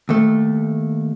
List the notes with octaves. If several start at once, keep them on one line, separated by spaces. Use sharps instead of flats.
D#2 A3